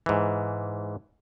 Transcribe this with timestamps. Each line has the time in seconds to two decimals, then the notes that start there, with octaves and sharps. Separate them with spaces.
0.06 G#2 E3